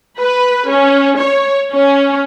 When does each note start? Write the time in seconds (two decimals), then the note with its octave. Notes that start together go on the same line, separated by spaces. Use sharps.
0.20 B4
0.69 C#4
1.19 C#5
1.74 C#4